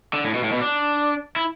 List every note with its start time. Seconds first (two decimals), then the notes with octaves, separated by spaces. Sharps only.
0.13 D3
0.24 A2
0.34 B2
0.44 A2
0.52 B2
0.61 D4
1.36 E4